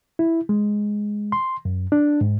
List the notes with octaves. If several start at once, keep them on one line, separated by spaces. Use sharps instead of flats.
E4
G#3
C6
F#2
D4
G#2